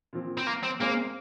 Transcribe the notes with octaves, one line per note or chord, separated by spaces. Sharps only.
A#2 F3 C4
C4
A#3
C4
G#3 A#3 C4 G#4 C5